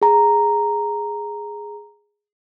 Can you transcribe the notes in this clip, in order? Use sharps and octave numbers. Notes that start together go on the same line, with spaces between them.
G#4 A#5